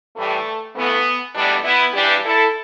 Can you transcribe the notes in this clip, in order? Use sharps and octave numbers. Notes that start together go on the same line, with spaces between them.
A2 E3 G3 A3
G2 E3 A3 B3
E2 B2 G3 A3 D4
B3 E4
G2 E3 G3 D4 G4
E4 A4